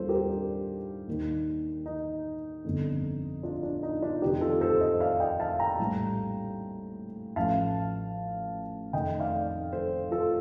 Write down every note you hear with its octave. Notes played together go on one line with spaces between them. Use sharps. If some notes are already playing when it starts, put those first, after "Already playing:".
Already playing: D#2 D#3 G3 C4 F4 A4 C5
G4 A#4
D4
D#2 D#3 A#3
D#4
G1 F2 D3
D4 F4
D4
D#4
D4 F4
F1 F2 D#3 A#3 D#4 G4
F4 A4
A4 C5
C5 D#5
D5 F5
D#5 G5
F5 A5
G5 A#5
A#1 A2 G3
A1 A2 F3 F5 A5
F1 F2 D#3 A3 D#5 G5
D5 F5
A4 C5
F4 A4